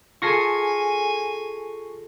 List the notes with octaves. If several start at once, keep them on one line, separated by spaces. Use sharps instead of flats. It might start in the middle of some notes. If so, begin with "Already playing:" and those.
F4 G#4 A4 G#5 C#6 A#6 C7